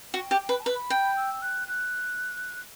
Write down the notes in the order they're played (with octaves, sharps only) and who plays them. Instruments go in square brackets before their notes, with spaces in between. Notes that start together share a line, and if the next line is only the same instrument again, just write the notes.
[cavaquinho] F#4 [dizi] G5
[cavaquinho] G4
B4
[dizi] A5
[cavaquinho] B4 [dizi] B5
[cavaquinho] G5
[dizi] E6
F#6
F#6